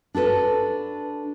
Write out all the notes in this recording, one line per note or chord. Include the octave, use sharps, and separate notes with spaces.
D4 F#4 A4 B4